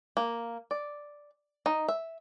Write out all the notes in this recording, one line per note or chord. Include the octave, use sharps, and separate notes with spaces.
A#3
D5
D#4
E5